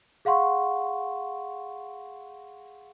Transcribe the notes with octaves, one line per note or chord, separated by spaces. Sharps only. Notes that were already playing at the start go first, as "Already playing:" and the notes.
G#4 F5 F#5 C6 C#6